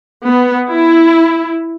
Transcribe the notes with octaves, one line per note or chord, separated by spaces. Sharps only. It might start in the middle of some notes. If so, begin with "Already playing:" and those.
B3
E4